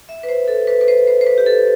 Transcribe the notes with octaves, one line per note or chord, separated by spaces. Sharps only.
E5
B4
C5
A4
B4
B4
C5
C5
C5
B4
G4
A4